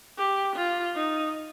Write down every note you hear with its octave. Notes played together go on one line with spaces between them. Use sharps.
G4
F4
D#4